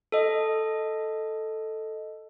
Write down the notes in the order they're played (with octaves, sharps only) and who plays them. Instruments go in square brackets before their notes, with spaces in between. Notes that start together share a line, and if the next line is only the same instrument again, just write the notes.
[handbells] A4 D#5